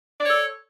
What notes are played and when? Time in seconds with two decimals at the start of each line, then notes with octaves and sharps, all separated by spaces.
0.20 D5
0.24 C#5
0.29 A4